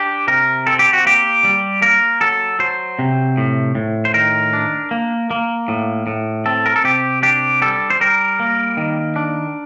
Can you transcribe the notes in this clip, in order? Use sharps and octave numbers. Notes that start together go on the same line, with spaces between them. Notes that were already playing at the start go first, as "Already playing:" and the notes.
Already playing: D4 G4
C3 A#4
C4 A4
G4
F#4
A#3 G4
G3
A#3 A#4
F#3 A4
F#3 C5
C3
A2
A2
C5
D#3 A#4
D4
A#3
A#3
A2
A2
C4 A4
A#4
A4
C3 G4
D4 G4
G3 A4
C5
G3 A#4
A#3
D#3
D4